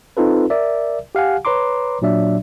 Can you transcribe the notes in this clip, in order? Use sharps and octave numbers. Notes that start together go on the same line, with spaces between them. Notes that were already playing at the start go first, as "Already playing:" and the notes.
C4 D#4 F4 A4 B4
A#4 D5 E5
G4 F5 F#5 G#5
B4 C#5 A#5 C6 D6
A#2 F#3 D4 D5 E5